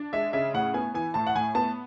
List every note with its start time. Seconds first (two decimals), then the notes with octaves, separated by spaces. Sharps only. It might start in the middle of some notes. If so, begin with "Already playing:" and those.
Already playing: D4
0.13 G#3 E5
0.33 C#3 E5
0.54 A2 F#5
0.74 B3 G#5
0.94 E3 G#5
1.14 A2 A5
1.27 F#5
1.35 A2 G#5
1.55 B3 A5